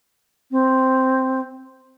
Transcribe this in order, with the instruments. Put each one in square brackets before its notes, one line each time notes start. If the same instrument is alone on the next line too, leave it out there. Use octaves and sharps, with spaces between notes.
[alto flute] C4